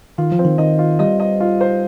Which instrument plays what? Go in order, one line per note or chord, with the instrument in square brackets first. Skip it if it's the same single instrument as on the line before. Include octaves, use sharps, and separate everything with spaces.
[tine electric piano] D#3 [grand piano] F4
[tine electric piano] F3
[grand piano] C4
[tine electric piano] D#3
[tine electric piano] D#3 [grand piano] D#5
[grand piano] F4
[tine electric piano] G3 [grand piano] D#5
[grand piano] D#5
F4
C5